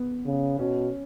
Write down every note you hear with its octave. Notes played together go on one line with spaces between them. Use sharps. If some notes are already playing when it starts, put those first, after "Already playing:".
Already playing: B3
C#3
B2 C#4